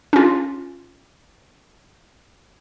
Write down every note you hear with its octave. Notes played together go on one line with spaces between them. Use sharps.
C#4 F4